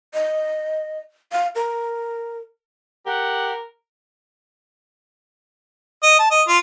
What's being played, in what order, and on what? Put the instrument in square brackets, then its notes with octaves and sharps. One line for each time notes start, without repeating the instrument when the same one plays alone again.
[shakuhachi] D#5
F5
A#4
[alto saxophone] G4 [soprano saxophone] A#4 [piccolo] F#5
[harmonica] D#5
A5
D#5
F4